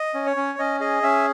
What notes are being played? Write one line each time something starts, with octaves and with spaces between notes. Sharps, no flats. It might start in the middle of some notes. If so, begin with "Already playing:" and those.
Already playing: D#5
C#4
C#5
C#4
C#4 D#5
G#4 D#5
C#4 E5